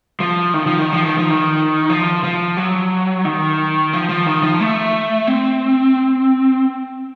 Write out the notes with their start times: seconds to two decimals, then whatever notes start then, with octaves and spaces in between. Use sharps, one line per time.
0.20 F3
0.54 D#3
0.67 F3
0.79 D#3
0.92 F3
1.05 D#3
1.18 F3
1.30 D#3
1.90 F3
2.24 F3
2.57 F#3
3.25 D#3
3.93 F3
4.09 F3
4.26 D#3
4.43 F3
4.60 A3
5.27 C4